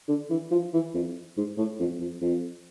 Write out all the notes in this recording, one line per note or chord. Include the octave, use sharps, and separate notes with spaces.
D3
E3
F3
E3
F2
G#2
A2
F2
F2
F2